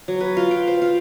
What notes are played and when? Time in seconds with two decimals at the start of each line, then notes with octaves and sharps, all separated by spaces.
0.08 F#3
0.21 B4
0.37 F4
0.51 G5
0.68 C5
0.82 F4